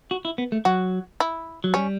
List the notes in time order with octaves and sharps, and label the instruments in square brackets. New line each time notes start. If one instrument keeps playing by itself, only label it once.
[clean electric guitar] F#4
E4
B3
A3
[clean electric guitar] F#3 [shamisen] F#4
[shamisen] E4
[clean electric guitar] F#3
[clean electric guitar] G3 [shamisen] C#4